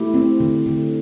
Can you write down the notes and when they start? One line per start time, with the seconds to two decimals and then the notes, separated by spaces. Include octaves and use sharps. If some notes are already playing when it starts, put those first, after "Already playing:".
Already playing: A3 E4 G4
0.14 C4
0.40 D3
0.66 D3